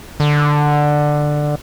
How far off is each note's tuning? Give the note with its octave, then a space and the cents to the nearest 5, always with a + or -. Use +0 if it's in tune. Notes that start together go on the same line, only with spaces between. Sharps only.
D3 +10